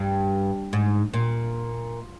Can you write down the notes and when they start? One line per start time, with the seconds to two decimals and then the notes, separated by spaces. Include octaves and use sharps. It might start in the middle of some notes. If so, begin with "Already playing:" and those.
Already playing: G2
0.73 G#2
1.14 A#2